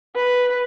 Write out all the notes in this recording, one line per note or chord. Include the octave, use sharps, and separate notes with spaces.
B4